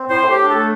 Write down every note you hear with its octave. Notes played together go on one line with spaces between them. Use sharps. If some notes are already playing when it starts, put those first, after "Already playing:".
Already playing: C4
A2 C5
A2
G4
D4
A3 A4